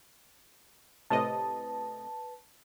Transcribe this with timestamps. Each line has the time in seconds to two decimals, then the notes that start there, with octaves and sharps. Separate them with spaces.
1.10 A2 C3 B4 D#5 A5